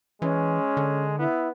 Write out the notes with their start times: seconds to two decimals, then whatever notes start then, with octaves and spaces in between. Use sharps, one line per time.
0.22 E3 G#3 C#4
0.77 D3
1.19 B3 E4